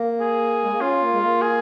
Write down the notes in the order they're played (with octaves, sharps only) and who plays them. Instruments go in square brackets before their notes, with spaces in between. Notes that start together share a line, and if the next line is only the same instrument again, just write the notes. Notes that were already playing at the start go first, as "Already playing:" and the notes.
Already playing: [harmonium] A#3
[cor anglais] G#4
[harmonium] G#3
A#3
[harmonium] C#4 [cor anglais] F4
[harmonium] A#3
G#3
A#3
[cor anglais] G#4